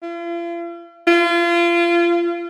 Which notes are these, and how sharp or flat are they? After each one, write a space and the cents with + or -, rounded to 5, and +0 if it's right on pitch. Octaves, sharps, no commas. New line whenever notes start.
F4 -45
F4 -30